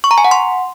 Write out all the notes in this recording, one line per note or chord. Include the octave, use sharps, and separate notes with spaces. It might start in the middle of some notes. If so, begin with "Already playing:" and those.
C#6
A#5
G#5
F#5
C6